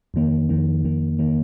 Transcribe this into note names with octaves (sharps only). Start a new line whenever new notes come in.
F2 D#3 A#3
F2 D#3 A#3
F2 D#3 A#3
D#3 A#3